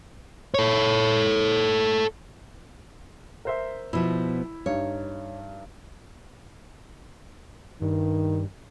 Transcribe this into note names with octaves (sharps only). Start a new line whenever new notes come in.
A4 C#5
A#4 C5 E5
B2 F3 E4
G2 D#4 C#5
G2 D#3